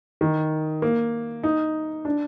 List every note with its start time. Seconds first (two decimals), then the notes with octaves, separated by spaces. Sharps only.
0.21 D#3
0.82 A#3
1.43 D#4
2.05 D4